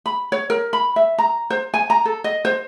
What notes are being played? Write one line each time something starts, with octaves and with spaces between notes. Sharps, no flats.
B5
C#5
A#4
B5
E5
A#5
C5
G#5
A#5
A4
D#5
C5